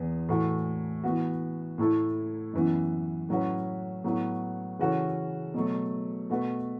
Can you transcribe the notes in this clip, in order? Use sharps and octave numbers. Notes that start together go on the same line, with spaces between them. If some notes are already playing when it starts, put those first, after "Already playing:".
Already playing: E2 E3 B3
A2 E3 A3 F#4
E3 B3 F#4
A2 A3 E4 A4
F#2 E3 B3
A2 F#3 C#4 F#4 B4
A2 F#3 B3 F#4
C#3 E3 C#4 F#4 A4
B2 F#3 A3
B2 A3 F#4 B4